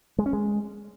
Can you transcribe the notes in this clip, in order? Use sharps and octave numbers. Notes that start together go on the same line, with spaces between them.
G#3
C#4
G#3